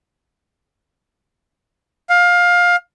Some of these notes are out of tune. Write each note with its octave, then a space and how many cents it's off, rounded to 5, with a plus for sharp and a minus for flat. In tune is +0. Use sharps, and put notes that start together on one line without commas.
F5 +20